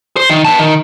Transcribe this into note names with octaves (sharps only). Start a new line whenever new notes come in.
C5
D#3
B3 A5
D#3